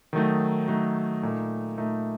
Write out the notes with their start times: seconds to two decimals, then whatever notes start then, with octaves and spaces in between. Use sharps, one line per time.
0.13 D#3 F#3 A3 D#4
0.68 D#3 F#3 A3 D#4
1.23 A#2 A3 D#4
1.78 A#2 A3 D#4